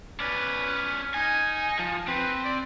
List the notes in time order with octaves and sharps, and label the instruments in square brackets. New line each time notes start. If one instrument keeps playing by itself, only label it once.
[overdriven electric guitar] C#4 D5 [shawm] B4
[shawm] D#4 [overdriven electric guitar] G#5
[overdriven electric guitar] F3
[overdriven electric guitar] C4 [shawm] B4
[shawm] D5